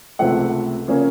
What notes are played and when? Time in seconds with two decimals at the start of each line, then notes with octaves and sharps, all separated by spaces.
0.19 C#2 C3 F3 A3 F#5
0.88 C#3 F3 A#3 C#4